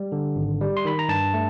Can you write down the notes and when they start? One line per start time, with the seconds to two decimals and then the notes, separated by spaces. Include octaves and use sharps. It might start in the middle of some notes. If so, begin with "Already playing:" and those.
Already playing: G3
0.12 D3
0.36 G#1
0.61 G3
0.77 C6
0.85 D#3 B5
0.99 A#5
1.09 G2 A5
1.34 A3